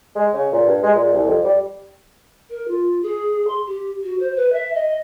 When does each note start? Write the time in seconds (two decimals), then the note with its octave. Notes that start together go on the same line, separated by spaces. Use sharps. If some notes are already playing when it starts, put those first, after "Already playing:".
0.15 G#3
0.34 C#3
0.52 A#2
0.66 G2
0.83 G#3
0.95 A#2
1.13 C2
1.27 F2
1.44 G3
2.50 A#4
2.68 F4
3.03 G#4
3.47 C6
3.67 G4
4.04 F#4
4.20 C5
4.36 B4
4.53 E5
4.75 D#5